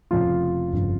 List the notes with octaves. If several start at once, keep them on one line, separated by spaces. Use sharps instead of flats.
F1 F2 C#3 F3 F4
G1 F2 C#3